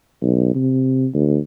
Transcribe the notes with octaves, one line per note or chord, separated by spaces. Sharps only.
B1
C3
D2